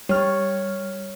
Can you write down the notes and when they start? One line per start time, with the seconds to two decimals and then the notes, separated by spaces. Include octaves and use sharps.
0.09 G3 C#5 F6